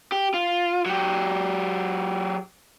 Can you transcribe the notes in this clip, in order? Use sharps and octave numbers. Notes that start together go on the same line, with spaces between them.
G4
F4
F#3 G4